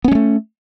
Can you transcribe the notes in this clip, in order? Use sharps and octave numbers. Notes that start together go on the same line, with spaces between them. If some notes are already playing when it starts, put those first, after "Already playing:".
G#3 A3 B3 C#4